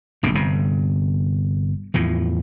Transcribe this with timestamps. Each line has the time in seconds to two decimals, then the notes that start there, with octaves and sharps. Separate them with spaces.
0.23 F1 A#1 F2 B2
0.35 G1 G2 C3
1.94 E2 A2 F3